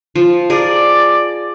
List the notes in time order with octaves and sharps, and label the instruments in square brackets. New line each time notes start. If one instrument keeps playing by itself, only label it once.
[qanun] F3
[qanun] G#4 A#4 [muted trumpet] D5